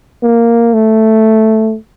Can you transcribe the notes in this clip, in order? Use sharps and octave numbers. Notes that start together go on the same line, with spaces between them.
A#3
A3